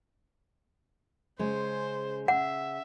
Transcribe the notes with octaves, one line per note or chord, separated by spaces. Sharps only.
C#3 G#3 C5
C#3 E5 F#5